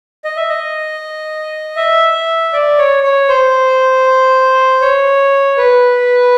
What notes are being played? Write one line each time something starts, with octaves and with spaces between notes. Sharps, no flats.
D#5
E5
D#5
E5
D5
C#5
C#5
C5
C#5
B4